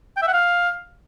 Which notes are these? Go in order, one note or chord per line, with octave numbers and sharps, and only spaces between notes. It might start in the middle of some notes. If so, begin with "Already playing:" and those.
G5
E5
F#5
F5